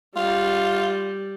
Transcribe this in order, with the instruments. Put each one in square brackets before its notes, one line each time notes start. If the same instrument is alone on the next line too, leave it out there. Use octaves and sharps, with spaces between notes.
[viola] G3 [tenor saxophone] F4